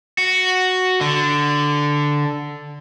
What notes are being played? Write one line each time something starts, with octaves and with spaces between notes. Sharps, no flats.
F#4
D3